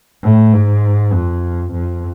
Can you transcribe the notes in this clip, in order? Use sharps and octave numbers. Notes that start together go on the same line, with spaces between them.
A2
G#2
F2
F2